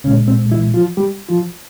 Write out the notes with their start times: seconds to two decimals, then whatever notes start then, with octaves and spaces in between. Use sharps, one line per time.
0.04 C2 A#2 C#3 G#3 C#4
0.28 C4
0.51 E3 E4
0.74 F3 F4
0.97 G3 G4
1.29 F3 F4